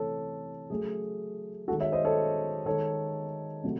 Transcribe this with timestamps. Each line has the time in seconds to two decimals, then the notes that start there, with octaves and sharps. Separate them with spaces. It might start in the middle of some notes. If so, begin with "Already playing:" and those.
Already playing: C3 E3 A3 A4 C#5
0.70 C#3 F#3 A3 G#4
1.68 D#3 G#3 F#4 A4
1.80 C#5 E5
1.92 C5 D#5
2.05 A4 C#5
2.66 D#3 G#3 A4 C#5
3.64 C3 F#3 A3